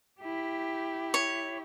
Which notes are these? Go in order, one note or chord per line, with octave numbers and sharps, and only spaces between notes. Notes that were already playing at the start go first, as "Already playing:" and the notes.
E4 G4
C#5